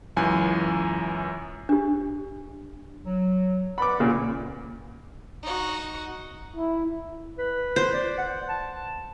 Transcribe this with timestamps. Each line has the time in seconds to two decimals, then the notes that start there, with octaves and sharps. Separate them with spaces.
0.16 C#2 F#2 E3 G#5
1.69 D4 G4
3.06 F#3
3.78 B4 D5 F#5 B5 D6
4.00 A#2 C#3 A#3
5.43 D#4 F#4
6.56 E4
7.38 B4
7.76 C5
7.93 D5
8.18 F#5
8.49 A5